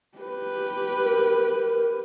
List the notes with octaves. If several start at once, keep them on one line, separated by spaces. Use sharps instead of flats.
G4 B4
A#4